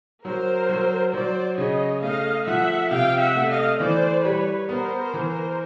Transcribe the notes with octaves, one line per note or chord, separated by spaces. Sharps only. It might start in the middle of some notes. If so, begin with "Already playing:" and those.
F#3 A#4 C5
F#3
F#3 C5 D5
C#3 C#5 D#5
A3 D#5 F5
F3 E5 F#5
C3 F5 G5
E5 F#5
A3
D#5 F5
E3 C5 D5
G3 B4 C#5
B3 A#4 C5
A#4 C5
E3
A#4 C5